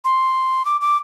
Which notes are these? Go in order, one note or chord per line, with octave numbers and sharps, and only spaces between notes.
C6
D6
D6